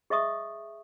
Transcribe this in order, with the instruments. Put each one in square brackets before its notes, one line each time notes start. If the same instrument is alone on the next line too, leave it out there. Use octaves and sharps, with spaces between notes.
[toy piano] G#4 D#5 E5 C#6 D#6